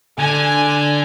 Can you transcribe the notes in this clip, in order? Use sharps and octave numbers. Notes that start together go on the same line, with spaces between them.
D3 G#5